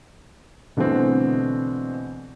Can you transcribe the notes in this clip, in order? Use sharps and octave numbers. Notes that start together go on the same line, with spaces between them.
B2 D3 E3 G3 A3 C4